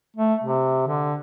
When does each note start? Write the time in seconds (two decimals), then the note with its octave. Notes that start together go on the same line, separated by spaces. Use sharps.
0.17 A3
0.44 C3
0.87 D3